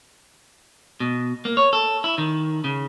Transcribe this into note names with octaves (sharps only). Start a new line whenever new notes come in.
B2
A#3
C#5
A4
E4
D#3
C#3